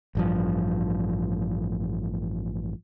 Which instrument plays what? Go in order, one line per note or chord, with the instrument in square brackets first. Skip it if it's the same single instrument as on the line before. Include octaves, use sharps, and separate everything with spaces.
[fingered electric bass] A1 G2 F3